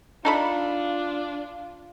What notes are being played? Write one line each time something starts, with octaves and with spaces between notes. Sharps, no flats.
D4 D#4 F4 A4 B5